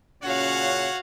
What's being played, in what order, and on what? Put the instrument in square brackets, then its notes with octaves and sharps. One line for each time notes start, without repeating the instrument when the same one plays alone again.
[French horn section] A#2 C#3 C#4 [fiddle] F#4 F5 [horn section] C#5 F#5